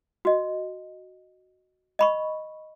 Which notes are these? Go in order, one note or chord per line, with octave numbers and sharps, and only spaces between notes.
F#4 D#5
D#5 B5 C#6